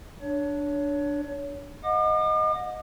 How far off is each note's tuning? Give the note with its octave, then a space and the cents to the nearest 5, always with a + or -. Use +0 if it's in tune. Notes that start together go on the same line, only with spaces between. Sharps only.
D4 +0 C#5 +25
D#5 +5 F#5 -35 D6 +45